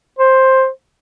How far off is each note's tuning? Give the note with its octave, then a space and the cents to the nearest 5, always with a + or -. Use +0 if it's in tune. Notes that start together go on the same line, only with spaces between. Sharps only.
C5 +10